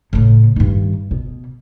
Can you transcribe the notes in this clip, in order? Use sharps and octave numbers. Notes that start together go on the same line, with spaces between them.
A2 C#3
G2 D#3
B2